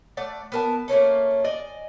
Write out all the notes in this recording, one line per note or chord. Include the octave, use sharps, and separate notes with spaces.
A3 D5 F#5
B3 A#4 A5
A3 A#3 C#4 A4
D5 D#5 G#5